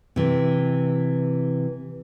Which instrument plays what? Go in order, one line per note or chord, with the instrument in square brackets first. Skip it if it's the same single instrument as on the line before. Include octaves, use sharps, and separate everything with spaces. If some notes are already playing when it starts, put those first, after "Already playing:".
[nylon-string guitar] C3 E3